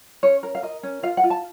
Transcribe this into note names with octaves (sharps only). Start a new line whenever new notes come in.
C#4 C#5
A#4
F5
A#4 D#5
C#4
F4 F5
F#5
F4
A5